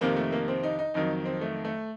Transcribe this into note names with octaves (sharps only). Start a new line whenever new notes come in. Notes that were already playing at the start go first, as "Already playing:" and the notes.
F2 C3 D#3 A#3
A3
A#3
C4
D#4
D#4
F2 D#3 F#3 D#4
C4
A3
A3